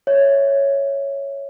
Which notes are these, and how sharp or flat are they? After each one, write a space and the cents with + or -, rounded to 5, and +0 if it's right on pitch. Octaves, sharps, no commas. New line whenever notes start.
C#5 +0 E5 +0